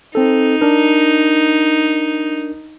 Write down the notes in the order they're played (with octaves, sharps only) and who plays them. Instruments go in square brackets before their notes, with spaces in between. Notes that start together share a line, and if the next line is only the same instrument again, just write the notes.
[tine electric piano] C4 A4 [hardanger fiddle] D#4
[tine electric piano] D4 A#4